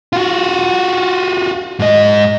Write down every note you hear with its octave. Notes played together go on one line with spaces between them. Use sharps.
F4 F#4
G#2 D#5